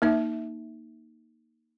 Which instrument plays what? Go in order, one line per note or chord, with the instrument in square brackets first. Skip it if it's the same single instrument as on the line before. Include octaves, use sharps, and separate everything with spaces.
[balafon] A#3 D#4 E5